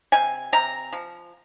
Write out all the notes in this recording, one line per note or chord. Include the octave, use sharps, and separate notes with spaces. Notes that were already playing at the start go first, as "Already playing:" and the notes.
C3 G#5
C3 A#5
F3